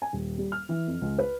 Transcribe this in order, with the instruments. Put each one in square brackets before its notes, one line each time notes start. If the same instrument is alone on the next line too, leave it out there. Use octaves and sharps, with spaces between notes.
[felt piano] G#5
D#1
G3
F6
E3
F2
C#2
B4